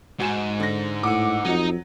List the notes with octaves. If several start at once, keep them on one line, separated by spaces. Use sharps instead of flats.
G#2 F#4 G#5 E7
D3 A#6
A2 F#5 D6 E6
F2 F#3 D#4 D#5